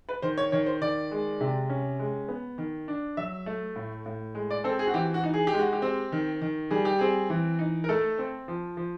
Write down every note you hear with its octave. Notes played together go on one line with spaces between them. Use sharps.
B4
D#3 C5
C#5
D#3 C#5
C5
D#3 D5
G#3
C3
C#4
G#3
B3
D#3
D4
F#3 E5
A3
A2
A2
G#3
D5
C4 A4
G#4
F#4
E3 G4
F#4
D#4
G#4
G4
G#3
F#4
G4
C4
D#3
D#3
G3 G#4
G4
C4 G#4
E3
D#4
A#4
A3 A4
C4
F3
F3